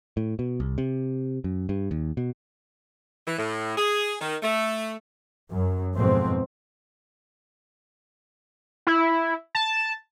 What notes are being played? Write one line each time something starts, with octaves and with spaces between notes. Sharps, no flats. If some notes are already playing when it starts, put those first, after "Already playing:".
A2
B2
C2
C3
F#2
G2
D#2
B2
E3
A2
G#4
D#3
A3
F#2
F2 G#2 B2 C4
E4
A5